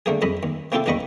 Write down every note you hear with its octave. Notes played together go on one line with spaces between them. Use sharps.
D3 A3 A#3 G#4
F2 G#3 D#5 B5
D#2
C3 A#3 E4 F4 G4 A4
A#1 E2 A#3 D#5 B5 C#6